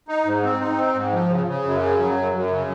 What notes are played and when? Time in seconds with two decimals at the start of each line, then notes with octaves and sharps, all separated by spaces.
0.08 D#4
0.25 G#2
0.43 C4
0.60 D#4
0.77 C4
0.94 G#2
1.12 F3
1.30 C#3
1.46 C#3
1.65 F#2
1.82 C#3
1.99 F#3
2.16 F#2
2.34 F#2
2.51 C#3